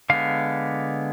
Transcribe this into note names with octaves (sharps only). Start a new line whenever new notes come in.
D3 G#3 B3 F5